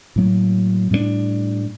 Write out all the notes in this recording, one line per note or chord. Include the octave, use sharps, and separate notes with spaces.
A2 F#3 A#3
A2 G3 A#3 D4